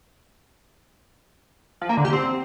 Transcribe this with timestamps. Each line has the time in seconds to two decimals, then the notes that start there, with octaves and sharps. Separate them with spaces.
1.81 F3
1.89 A#3
1.97 D3
2.05 G4
2.13 C4